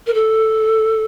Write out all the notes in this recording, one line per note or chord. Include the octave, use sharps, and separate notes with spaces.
A#4
A4